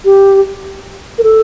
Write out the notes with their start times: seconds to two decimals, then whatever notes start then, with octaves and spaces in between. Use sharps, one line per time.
0.05 G4
1.18 A#4
1.23 A4